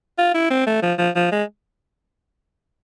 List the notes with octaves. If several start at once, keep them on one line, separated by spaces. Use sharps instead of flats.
F4
E4
C4
A3
F3
F3
F3
G#3